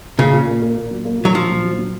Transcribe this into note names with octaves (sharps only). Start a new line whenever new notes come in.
A#2 C#3
A#2
A#3
A#3
A#2
F#3
A#3
A#2 F#3
F3 F#3
A#2
F#3
F#3